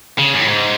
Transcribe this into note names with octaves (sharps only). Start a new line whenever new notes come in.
C#3
F#2
A2
G#2